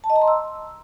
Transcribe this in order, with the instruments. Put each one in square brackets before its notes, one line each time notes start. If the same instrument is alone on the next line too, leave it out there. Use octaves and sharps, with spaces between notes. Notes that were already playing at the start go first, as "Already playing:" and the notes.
[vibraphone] A5
D#5
A#5
C6
E6